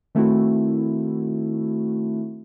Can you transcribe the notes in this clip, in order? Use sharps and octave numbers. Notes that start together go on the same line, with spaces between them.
D#3 A3 C4 E4 F#4